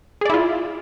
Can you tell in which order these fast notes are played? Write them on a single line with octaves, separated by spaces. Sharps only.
G#4 D5 E4 F4